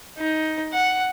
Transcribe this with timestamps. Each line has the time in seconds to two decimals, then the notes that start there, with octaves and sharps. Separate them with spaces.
0.18 D#4
0.73 F#5